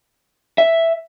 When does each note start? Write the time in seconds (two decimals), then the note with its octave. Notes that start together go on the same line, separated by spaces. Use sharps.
0.58 E5